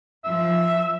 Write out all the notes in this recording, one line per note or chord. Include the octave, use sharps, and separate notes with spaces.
F3 E5